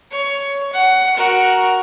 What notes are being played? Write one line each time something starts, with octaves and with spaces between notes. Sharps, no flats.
C#5
F#5
F#4 A#4